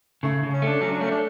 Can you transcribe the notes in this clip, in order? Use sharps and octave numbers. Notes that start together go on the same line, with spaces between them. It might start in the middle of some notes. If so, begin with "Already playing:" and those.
C#3 A3
C#3
C#4
A3 D4
F#3 C#4
D4
A3 C#4
D4